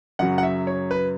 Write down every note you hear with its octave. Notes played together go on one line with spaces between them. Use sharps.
F#2 C#3 F#3 F#5
F#5
E5
C#5
B4